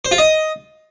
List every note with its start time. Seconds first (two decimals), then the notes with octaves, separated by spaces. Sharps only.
0.05 C5
0.11 F4
0.18 D#5